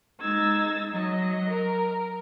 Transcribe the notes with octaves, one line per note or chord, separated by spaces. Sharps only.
G#3 D#4 E6 G#6 A6
F#3 D#5
A#4